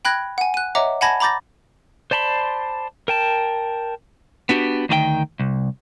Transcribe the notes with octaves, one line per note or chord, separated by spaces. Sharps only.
G5 B5 F#6 G#6 A#6
F#5 G#5
F#6 D#7
C#5 D#5 E5 F#5 A#5 D6
F#5 G#5 A5 B5 G#6 A#6
A#5 B5 D6 G6 A6 A#6
C5 D5 A5 B5 C6
A#4 G5 A5
B3 D4 F#4 G4
D2 D#3 F#4 G5
C2